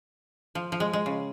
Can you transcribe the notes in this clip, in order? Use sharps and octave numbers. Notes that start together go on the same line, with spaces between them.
F3
F3
G#3
G#3
C#3